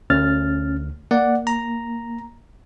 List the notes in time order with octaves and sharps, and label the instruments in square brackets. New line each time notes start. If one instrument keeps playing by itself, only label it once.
[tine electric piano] D2 [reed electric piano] C#4 F6 A6
[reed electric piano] A#3 [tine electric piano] D5 F#5
[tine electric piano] A#5